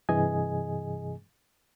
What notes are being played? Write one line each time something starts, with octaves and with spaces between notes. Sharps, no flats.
G2 C3 E3 G#4 D#5 G#5